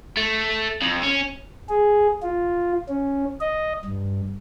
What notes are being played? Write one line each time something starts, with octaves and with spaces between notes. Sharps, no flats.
A3
F2
C#4
G#4
F4
C#4
D#5
G2